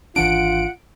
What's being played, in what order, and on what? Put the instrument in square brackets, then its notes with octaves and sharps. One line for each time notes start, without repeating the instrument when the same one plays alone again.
[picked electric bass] G#1 E3 D4 [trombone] F4 [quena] F#5 [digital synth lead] D7